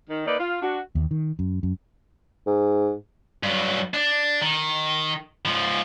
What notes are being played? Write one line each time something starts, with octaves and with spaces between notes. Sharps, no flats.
D#3
A#3 D#4 B4 D5
F4
D4 F#4
D#2
D#3
F#2
F#2
G#2
G2 F#3
D4
D#3
G#2 F3